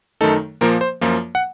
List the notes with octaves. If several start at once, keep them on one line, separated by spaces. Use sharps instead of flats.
F#2 D#3 A3 D#4 A4
A#2 F3 A#3 A#4
C5
F#2 F3 A#3 F4
F#5